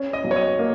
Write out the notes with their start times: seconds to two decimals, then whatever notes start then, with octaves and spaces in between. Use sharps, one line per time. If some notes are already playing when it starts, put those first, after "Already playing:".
Already playing: C#4
0.13 D#5
0.24 B1
0.31 C#5
0.36 D#5
0.59 A#3